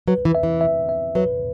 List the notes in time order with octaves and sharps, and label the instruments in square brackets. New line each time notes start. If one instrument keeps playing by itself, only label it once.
[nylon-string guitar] F#3 [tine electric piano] B4
[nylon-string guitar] E3
[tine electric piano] E5
[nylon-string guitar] E3
[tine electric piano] E5
E5
[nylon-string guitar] F#3 [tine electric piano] B4